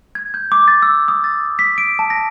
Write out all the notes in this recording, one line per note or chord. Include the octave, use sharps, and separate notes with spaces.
G#6
G6
D6
A6
E6
D#6
A6
B6
D7
A5
A#6